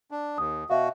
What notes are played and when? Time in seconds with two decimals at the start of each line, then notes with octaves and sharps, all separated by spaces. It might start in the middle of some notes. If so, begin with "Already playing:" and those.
0.11 D4
0.38 D#2 D#6
0.70 B2 F#4 E5 F5